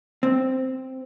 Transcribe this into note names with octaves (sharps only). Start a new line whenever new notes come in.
C4